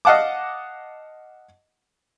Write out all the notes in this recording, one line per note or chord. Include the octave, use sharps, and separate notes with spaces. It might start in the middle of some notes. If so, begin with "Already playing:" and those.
D#5 F5 F#5 A5 D6